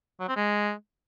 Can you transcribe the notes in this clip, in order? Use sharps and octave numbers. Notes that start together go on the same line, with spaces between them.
F#3
C4
G#3